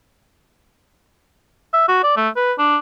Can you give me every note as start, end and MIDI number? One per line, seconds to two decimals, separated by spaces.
1.73 1.85 76
1.88 2.00 66
2.04 2.16 74
2.17 2.29 57
2.36 2.53 71
2.58 2.78 62